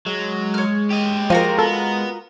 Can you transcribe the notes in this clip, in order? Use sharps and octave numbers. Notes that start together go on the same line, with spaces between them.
F#3 G#3
C#5 F6
G4 D#5
F3 F4 F#4 A#4
B3 A4